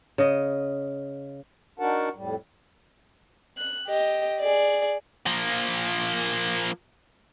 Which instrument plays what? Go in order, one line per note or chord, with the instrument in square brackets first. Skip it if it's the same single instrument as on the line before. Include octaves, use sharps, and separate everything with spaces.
[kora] C#3 D#5
[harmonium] D4 D#4 F#4 A#4 F#5 A5
F2 A2 G3
[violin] F#6
G4 D#5
G#4 D5
[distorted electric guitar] F3 A#3